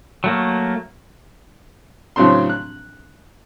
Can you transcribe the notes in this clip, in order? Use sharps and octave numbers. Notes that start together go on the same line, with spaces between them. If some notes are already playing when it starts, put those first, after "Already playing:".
F#3 A3 A#3
A2 C#3 F#3 C4 D4 C6
F#6